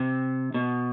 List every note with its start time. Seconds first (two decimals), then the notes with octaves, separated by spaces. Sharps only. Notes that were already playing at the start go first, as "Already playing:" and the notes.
Already playing: C3
0.54 B2